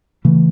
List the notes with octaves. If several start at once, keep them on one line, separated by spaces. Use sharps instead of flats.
C#3 E3 A3